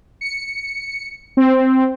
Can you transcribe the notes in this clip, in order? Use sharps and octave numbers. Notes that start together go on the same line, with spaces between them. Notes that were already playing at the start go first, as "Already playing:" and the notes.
C#7
C4